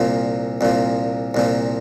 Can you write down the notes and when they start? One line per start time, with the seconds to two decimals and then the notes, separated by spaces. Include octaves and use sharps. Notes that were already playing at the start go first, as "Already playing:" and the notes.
Already playing: C2 A#2 F3
0.61 C2 A#2 F3
1.34 C2 A#2 F3